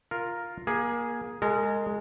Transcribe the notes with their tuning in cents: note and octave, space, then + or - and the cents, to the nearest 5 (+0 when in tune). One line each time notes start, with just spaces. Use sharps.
F4 +0 A#4 +0
A#3 +25 G#4 +0
G#3 +0 A#4 -35